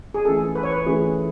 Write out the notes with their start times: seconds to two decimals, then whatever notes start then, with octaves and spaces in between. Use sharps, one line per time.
0.14 G#4
0.25 E3 A3 C#4 G#4 A4
0.55 B4
0.63 C#5
0.71 B4
0.86 E3 A3 C#4 G#4